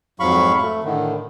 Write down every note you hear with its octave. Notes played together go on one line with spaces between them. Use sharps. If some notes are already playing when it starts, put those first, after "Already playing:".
F2 G#2 F#3 F5 B5 C#6
A3
A2 D3 D#3